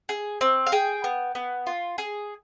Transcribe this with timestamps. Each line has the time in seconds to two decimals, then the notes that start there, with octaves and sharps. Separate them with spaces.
0.09 G#4
0.41 C4
0.67 F5
0.72 G#4 G5
1.04 B3
1.35 B3
1.67 F4
1.98 G#4